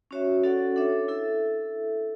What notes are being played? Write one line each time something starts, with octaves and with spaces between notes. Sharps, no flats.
C#4 F#4 C#5 E5
C#4 F#4 A4 D5 F#5
D4 A4 C#5 E5
E4 A4 E5